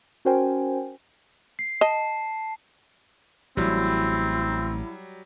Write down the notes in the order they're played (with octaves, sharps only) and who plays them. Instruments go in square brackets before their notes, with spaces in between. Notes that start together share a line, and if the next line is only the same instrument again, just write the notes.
[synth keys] C#4 F#4 A#4 C5 G5 G#5
[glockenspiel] C7
[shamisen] D#5 [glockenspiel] A5
[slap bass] A1 [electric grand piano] F#3 G3 [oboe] C4 [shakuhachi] E4